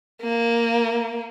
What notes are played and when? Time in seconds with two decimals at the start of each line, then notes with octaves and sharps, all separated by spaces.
0.22 A#3